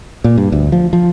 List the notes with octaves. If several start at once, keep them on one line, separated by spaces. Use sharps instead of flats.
A#2
G2
D2
F3
F3